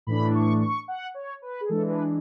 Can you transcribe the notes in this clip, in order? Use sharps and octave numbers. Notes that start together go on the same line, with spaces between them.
A2 E3 A3 D4 B5
C#6
C#6
F#5
C#5
B4
G#4
E3 G#3 D4 A4
B4